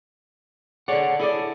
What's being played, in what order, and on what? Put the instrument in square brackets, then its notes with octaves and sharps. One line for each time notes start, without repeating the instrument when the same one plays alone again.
[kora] D3 D5 [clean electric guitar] G#4 C#5 F#5
[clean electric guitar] E4 G#4 [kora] A4 D5